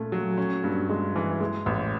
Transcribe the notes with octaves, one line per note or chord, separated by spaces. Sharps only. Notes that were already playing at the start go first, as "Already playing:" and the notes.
Already playing: A#2 A3 C#4
F#3
C#4
G2
G#3
E3
G#3
A1